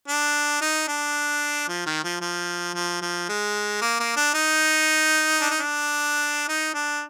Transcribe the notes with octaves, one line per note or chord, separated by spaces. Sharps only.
D4
D#4
D4
F3
D#3
F3
F3
F3
F3
G#3
A#3
A#3
D4
D#4
D4
D#4
D4
D#4
D4